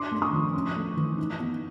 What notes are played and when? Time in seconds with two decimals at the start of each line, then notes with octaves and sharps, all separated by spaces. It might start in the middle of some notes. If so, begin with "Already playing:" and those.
Already playing: D4 C6 D6
0.11 A3
0.22 C#6 D#6
0.33 F3
0.54 C#4
0.76 A3
0.97 E3
1.18 D#4
1.40 B3